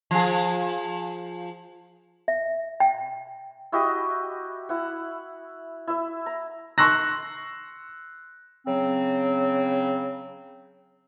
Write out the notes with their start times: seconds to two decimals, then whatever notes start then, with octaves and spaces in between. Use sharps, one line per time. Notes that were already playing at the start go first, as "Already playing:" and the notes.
0.11 F3 G#4
2.28 E5
2.80 G5
3.72 E4 F#4 G4 D#5
4.69 E4 F#5
5.87 E4 E5
6.26 A#5
6.78 C6 C#6 E6 F#6 A#6
8.67 C#3 F#3 C4